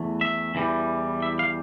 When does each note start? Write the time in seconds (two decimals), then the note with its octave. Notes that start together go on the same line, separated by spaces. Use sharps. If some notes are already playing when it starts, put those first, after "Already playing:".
Already playing: E2 E3 A3
0.21 E5
0.55 E2 E3 G3
1.22 E5
1.39 F5